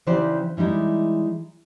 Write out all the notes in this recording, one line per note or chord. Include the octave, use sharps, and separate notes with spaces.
C#3 E3 D#4 G4 C5 D5
E3 G3 G#3 D#4 E4